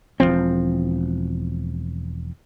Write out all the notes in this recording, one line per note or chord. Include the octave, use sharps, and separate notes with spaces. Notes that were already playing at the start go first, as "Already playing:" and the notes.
E1 E2 F3 C4